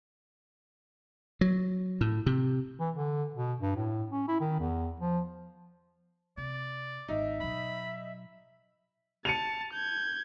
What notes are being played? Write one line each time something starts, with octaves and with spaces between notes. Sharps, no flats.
F#3
A2
C3
E3
D3
B2
G2
A2
C#4
E4
D#3
E2
F3
C3 D5
G#1 D#3 D#4 E5
B2 F#3 B5
A5 C#7 D#7 F7
G6 G#6